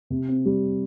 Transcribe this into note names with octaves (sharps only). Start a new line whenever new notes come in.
C3
C4
G3